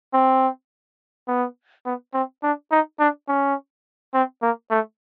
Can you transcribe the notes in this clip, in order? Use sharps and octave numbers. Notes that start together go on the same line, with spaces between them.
C4
B3
B3
C4
D4
D#4
D4
C#4
C4
A#3
A3